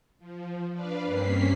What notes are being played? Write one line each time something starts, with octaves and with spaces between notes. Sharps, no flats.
F3
D4 B4 D5 F5
G2 A#3 C4 C#4 B6 C7